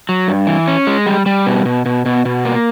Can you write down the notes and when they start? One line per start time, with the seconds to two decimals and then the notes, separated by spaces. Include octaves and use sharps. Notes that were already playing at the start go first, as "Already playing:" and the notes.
0.09 F#3
0.28 G2
0.47 E3
0.68 C#4
0.87 G#3
1.06 G3
1.26 G3
1.46 B2
1.65 B2
1.86 B2
2.06 B2
2.25 B2
2.45 A#3